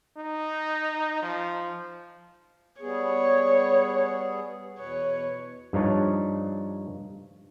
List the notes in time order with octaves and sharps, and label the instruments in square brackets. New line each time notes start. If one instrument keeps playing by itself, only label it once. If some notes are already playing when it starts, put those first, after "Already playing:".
[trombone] D#4
F3
[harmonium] G3 B3 G#4 [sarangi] C#5
[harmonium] E2 B2 B4 [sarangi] C#5
[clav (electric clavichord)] G2 F3 D#4 C#5 A5